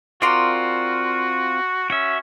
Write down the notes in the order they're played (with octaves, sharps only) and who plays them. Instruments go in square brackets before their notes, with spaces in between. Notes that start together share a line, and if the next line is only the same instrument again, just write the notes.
[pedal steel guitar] C4 F4 A#4 [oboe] F#4 [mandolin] D5 A#5 C6
[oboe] C#4 [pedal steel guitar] F#4 E5